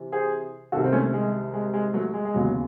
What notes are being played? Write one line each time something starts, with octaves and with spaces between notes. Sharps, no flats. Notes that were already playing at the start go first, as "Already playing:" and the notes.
Already playing: C3 E3
G#4 C5
C2 C3 D#3 F#4 A4
C4
A3 C#4
G#3
G#3
G#3
F#3 A3
G#3
G#3
E1 D#2 C#3 E3 F#3